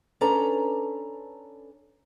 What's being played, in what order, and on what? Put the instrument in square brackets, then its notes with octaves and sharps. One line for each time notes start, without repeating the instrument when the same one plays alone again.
[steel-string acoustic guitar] C#4 D4 A4 B4 A#5